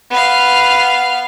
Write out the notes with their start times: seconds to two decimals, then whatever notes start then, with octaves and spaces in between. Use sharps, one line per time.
0.10 B3 F5